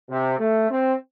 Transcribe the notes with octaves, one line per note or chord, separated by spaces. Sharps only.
C3
A3
C4